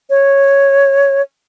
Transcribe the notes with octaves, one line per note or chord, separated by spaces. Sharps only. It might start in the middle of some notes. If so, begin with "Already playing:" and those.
C#5